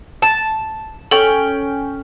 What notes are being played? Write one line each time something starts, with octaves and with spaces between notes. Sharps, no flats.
A5
C#4 A4 G5